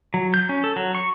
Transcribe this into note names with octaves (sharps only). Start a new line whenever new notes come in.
F#3
G6
C#4
A4
F#3
C#6